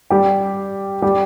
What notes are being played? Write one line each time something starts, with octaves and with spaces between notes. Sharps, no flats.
G3 G4
G3 G4